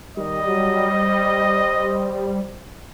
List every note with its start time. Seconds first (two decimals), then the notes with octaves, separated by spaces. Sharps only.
0.17 D#3 G3 D#5
0.46 F#3
0.93 C5